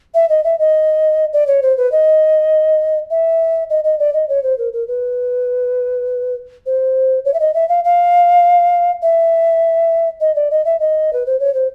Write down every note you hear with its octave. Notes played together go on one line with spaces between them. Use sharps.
E5
D#5
E5
D#5
D5
C#5
C5
B4
D#5
E5
D#5
D#5
D5
D#5
C#5
C5
A#4
A#4
B4
C5
C#5
E5
D#5
E5
F5
F5
E5
D#5
D5
D#5
E5
D#5
B4
C5
C#5
C5